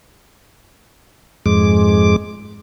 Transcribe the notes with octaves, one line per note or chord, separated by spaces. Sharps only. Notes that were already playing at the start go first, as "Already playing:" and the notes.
F2 G#2 G#3 D6